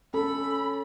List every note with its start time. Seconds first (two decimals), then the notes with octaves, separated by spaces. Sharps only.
0.14 C#4 A4 B5